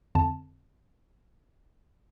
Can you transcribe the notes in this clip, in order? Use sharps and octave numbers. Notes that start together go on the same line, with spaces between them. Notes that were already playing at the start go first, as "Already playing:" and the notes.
F2 D3 A5